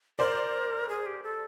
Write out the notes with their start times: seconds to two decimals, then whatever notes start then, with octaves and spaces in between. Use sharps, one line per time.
0.19 A#4 C5 D5
0.89 G#4
1.06 G4
1.23 A4